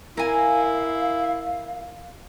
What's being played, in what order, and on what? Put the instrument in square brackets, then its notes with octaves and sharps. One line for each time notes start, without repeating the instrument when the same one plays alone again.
[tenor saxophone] E4 [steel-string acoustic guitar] A#4 [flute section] F5 [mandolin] G#5 A#5